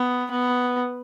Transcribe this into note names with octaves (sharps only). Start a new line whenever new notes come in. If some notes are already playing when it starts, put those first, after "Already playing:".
Already playing: B3
B3